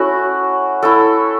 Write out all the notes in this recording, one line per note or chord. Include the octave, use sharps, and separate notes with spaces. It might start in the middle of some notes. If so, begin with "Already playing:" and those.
Already playing: A3 C#4 E4 F#4
A3 E4 A4